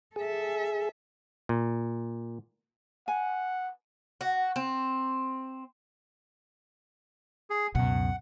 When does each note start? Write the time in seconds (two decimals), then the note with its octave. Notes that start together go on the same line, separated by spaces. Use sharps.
0.16 G#4 A4 E5
1.49 A#2
3.08 F#5 G#5
4.21 F#4
4.56 C4
7.50 G#4
7.75 C#2 F#2 B2 F#5